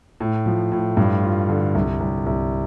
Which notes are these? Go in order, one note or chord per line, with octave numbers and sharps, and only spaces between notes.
A2
F3
A2
G2
F4
D3
C2
C2
C2